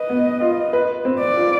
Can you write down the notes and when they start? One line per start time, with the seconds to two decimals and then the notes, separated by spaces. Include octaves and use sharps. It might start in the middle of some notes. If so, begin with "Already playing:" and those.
Already playing: B4 D#5
0.10 B3
0.41 F4
0.73 B4
1.05 C4
1.20 D5
1.36 F4